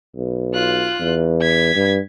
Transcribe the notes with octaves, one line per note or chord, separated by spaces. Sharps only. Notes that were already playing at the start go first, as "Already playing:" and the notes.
B1
F4 F#6
E2
G#6 B6
G2